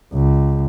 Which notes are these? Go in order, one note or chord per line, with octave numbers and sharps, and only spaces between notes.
C#2